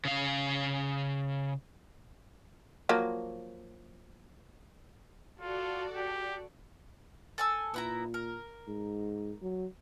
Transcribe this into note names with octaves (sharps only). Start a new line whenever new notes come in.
C#3 F5
F3 F#3 A#3
F4 F#4 A4 D5
G4
A4 G#5 E6
A#2 B3 E4 A#5
A#4
G#2
F#3